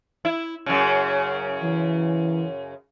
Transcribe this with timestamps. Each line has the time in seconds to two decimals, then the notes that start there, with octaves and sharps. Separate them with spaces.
0.25 E4
0.66 F#2 C#3
1.63 E3